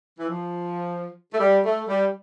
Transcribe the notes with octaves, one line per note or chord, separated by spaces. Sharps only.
E3
F3
A3
G3
A3
G3